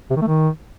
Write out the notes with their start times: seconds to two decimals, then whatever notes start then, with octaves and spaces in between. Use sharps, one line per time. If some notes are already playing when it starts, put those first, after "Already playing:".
0.10 C3
0.16 D#3
0.22 A3
0.27 D#3